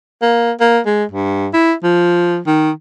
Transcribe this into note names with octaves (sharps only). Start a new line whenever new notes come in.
A#3
A#3
G#3
G2
E4
F3
D#3